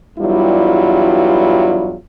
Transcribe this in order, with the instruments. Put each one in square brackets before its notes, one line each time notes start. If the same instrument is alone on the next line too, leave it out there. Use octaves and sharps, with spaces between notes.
[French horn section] E2 G2 F#3 G3 E4 F4